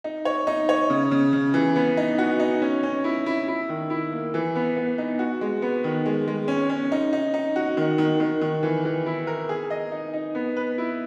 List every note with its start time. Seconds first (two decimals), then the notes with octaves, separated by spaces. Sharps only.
0.04 D#4
0.25 C#5
0.47 D#4
0.69 C#5
0.90 C#3
1.11 C#3
1.33 C#3
1.54 E3
1.76 B3
1.97 D#4
2.18 F#4
2.40 D#4
2.62 C#4
2.83 C#4
3.04 E4
3.26 E4
3.48 E4
3.69 D#3
3.90 E4
4.12 A#3
4.34 E3
4.55 B3
4.76 B3
4.98 D#4
5.19 F#4
5.41 G#3
5.62 B3
5.84 D#3
6.06 G#3
6.28 G#3
6.48 C#4
6.70 C#4
6.92 D#4
7.13 D#4
7.34 D#4
7.56 F#4
7.77 D#3
7.98 D#3
8.20 D#3
8.41 D#3
8.63 E3
8.85 E3
9.06 E4
9.27 A#4
9.49 G#4
9.70 D#5
9.92 D#4
10.14 D#4
10.35 B3
10.57 B4
10.78 E4